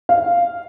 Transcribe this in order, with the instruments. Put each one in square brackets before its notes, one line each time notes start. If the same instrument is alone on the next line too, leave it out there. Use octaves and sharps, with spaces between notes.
[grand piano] F5